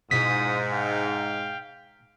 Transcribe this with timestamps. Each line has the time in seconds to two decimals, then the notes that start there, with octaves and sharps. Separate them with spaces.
0.11 G#2 B2 E4 F4 D#6 B6
0.71 F5 G5